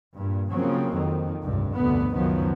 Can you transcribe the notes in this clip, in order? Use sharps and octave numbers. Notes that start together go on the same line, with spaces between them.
G2 A#2
C#3 F3 F#3 A#3 C4
F2 D#3
F1 C#2 G2
F1 D2 G2 B2 D3 B3
C#2 F#2 D#3 F3 F#3 B3